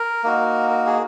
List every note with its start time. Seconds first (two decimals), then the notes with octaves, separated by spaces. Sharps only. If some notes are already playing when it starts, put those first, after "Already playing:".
Already playing: A#4
0.24 A#3 D#4 F#4
0.71 A#4
0.86 G#4